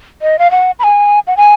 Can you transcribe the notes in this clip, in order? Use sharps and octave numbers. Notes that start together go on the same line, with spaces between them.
D#5
F5
F#5
B5
G#5
F#5
G#5